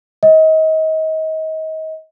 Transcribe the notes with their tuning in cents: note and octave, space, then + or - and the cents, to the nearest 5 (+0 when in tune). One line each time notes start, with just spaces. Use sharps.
D#5 +30